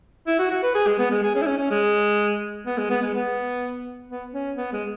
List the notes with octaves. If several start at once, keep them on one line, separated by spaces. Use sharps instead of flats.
E4
F#4
F#4
B4
G#4
G#3
B3
G#3
G#4
C#4
E4
C#4
C#4
G#3
B3
G#3
B3
G#3
B3
B3
C#4
B3
G#3